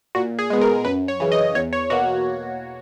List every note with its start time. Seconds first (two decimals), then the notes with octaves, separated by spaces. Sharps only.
0.15 A#2 F#4
0.39 G#4
0.50 G#3 B3
0.61 A#4
0.85 F#2 B4
1.08 C#5
1.20 C#3 E3
1.32 D#5
1.55 E2 C#5
1.73 C#5
1.90 B2 A#3 F#4